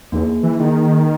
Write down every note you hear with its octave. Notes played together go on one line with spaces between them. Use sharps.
E2 A#3 D#4 G#4
E3
D#3 A#3 D#4 G#4